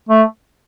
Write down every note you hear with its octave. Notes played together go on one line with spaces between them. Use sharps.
A3